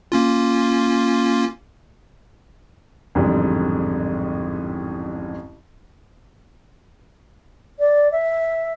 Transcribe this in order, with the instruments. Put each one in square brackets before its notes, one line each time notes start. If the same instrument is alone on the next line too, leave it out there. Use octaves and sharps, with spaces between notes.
[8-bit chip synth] A#3 C#4 F4
[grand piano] A1 F2 G#2 D3 G3
[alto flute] D5
E5